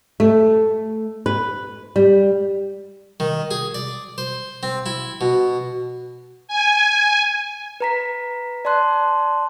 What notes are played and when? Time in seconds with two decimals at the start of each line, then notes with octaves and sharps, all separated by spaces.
0.20 A3
1.26 B4
1.96 G3
3.20 D#3
3.51 G#4
3.75 D5
4.18 C5
4.63 C4
4.86 E4
5.21 B2
6.48 G#5
7.80 B4 A#5 B6
8.65 D5 A5 C6 F#6